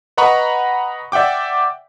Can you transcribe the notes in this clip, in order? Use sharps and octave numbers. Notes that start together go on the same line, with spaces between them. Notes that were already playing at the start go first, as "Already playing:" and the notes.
B4 D#5 F#5 A#5 B5 C#6
D5 E5 F#5 G5 D6